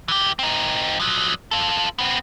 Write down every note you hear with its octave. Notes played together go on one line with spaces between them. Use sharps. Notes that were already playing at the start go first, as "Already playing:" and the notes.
E3 G4
C4 D#4
F3 F#3
F4 A4
B3 C4